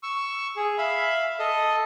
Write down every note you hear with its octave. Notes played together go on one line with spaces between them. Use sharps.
C#6 E6
G#4
E5 F5 B5
A4 D#5